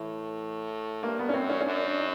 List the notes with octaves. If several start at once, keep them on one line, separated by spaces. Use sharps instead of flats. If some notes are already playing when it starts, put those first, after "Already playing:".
Already playing: A2 E3
G2 A#3
B3
C#4
F#2 C4
C#4
C#4
F#2 D4
D4
D#4